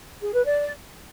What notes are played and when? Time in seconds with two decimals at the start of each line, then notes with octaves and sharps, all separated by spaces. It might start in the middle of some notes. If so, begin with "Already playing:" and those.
0.22 G#4
0.33 B4
0.44 D5